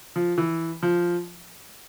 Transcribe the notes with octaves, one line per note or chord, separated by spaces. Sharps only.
F3
E3
F3